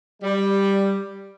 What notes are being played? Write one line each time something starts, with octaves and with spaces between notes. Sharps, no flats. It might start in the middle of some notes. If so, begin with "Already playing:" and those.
G3